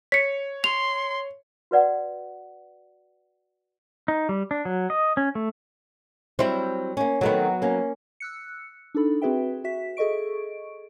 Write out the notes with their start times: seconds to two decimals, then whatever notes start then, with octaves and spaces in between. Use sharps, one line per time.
0.12 C#5 B6 C#7
0.64 C6 F7
1.71 F#4 B4 D5 F#5
4.08 D#4
4.29 G3
4.51 D4
4.65 F#3
4.90 D#5
5.17 C#4
5.35 A3
6.39 F#3 G3 C4 E4 C5
6.97 A#3 C#4
7.21 D#3 F#3 A3 B3 C4
7.62 A#3 C#4
8.20 E6 F#6 C#7
8.95 D4 D#4 A4 B5
9.22 C4 F#4 G#4 B4 E5 G5
9.64 F#4 E5 B6
9.97 G#4 A4 D#5 C#6 D7